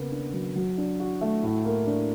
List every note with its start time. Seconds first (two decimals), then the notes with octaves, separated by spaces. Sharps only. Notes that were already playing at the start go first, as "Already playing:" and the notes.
Already playing: C#3 A#3 B3
0.12 D4
0.33 F#3
0.55 F#3
0.78 D4
1.00 F#4
1.21 A3
1.43 A2
1.65 A#3
1.87 D4